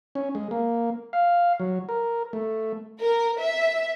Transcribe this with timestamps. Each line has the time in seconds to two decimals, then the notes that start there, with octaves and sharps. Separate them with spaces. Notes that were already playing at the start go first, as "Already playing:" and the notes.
0.15 C#4
0.35 G#3
0.51 A#3
1.13 F5
1.60 F#3
1.89 A#4
2.33 A3
3.00 A#4
3.39 E5